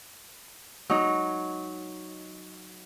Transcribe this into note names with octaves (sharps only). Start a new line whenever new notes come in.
F#3 D#4